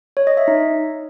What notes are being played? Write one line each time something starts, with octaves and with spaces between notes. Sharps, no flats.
C#5
D#5
E5
D#4